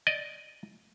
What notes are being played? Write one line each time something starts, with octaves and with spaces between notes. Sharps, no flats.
D5 D#5